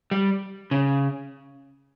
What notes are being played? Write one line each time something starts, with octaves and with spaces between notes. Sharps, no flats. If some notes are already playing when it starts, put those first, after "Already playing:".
G3
C#3